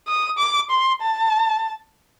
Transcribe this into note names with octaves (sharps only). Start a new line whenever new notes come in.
D#6
D6
C6
A5